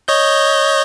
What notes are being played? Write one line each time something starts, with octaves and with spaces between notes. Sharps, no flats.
C#5 D#5 G6